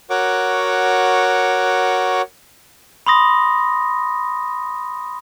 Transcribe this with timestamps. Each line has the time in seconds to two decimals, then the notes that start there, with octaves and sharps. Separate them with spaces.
0.10 F#4 A#4 C#5 F#5 C#6 D6
3.07 B5 C6 D#6 A#6